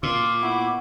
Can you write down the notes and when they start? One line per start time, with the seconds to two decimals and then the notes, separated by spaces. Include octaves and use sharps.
0.03 A#2 F4 D6 E6
0.43 B3 E4 F#5 C#6